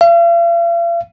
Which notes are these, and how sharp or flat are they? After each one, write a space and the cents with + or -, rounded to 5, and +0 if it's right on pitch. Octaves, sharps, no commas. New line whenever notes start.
F5 -45